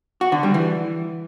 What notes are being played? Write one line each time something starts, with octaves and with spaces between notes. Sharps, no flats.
F#4
D3
G3
E3